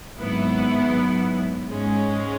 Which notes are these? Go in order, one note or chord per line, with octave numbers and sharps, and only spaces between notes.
G#1 G#2 F#3 B3 E4
G#2 G#3 C#4